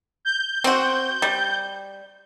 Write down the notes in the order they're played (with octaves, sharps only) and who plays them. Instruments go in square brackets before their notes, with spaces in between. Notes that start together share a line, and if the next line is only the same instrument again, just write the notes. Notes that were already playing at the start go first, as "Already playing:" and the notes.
[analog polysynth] G6
[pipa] C4 F#4
G3